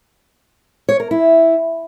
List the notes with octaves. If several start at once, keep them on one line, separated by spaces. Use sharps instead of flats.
C#5
A#4
E4